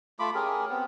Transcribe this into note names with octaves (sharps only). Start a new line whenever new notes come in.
A3 F4 B5 D6
C#4 G4 G#4 A#4
B3 C4